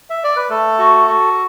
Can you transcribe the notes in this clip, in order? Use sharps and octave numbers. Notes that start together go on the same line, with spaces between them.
E5
D5
B4
A3 A4
F#4
F#4